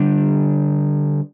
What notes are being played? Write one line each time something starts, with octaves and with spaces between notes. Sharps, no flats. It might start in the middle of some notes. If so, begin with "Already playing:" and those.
Already playing: D3 G3 D4